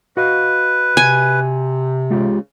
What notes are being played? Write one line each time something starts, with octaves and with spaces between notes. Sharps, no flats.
F#4 B4 D#5 F5
C3 G#5
C#3 G#3 F4 G4